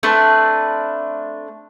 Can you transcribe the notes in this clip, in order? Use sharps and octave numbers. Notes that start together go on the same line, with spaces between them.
A3 C4 D4 B4